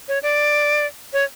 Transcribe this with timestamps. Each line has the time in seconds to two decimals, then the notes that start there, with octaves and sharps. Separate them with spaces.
0.08 C#5
0.23 D5
1.13 C#5